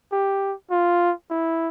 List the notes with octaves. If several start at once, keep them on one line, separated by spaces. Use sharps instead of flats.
G4
F4
E4